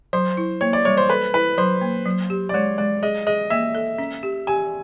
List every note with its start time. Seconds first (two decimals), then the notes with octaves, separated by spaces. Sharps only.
0.13 F#3 C5
0.37 E4
0.61 A#3 C#5
0.73 D5
0.85 G3 C#5
0.97 C5
1.10 A4 B4
1.34 E4 B4
1.58 F#3 C5
1.81 A#3
2.06 F#3
2.30 G4
2.49 D5
2.54 G#3 C#5
2.78 G#3 D5
3.03 G#4 D#5
3.27 G#4 D#5
3.50 A#3 E5
3.75 A4
3.98 C#4
4.23 G4
4.47 G4 G#5